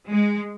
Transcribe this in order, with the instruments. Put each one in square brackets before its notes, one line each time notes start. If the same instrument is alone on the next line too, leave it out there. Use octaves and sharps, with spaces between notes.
[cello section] G#3